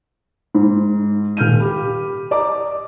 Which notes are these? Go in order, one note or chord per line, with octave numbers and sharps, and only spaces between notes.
G#2
D#1 F6 G6 D#7
G4 B5
D5 D#5 A#5 D6